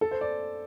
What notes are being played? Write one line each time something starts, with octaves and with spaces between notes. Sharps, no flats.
A4
C5
D5